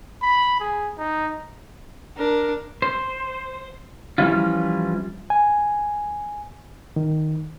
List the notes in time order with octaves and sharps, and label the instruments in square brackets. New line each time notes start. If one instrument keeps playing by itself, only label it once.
[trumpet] B5
G#4
D#4
[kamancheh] D4 [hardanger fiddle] A#4
[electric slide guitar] C5
E3 F3 G3 C#4 E4 F4
[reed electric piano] G#5
D#3